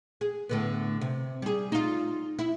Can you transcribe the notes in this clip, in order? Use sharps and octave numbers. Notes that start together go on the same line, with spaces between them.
G#4
A2 D3 B3
C3
G3 G#4
D#4 F4
E4